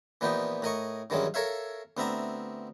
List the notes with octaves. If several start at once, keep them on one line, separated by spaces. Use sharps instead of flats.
A#2 E3 F3 B3 D#4 G4
A2 A#4 D#5 C#6
G2 D#3 E3 F#3 G#3 C#4
A4 A#4 C#5 E5 F5
D2 B3 C4 E5 A#5 D6